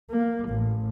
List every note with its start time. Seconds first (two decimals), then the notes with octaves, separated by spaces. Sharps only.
0.11 A#3
0.49 A1